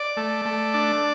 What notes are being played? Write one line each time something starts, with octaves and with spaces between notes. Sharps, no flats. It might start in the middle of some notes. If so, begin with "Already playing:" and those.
Already playing: D5
A3
A3
D4